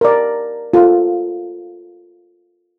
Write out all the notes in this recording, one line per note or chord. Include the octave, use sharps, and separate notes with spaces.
A#4 D5
F4 A4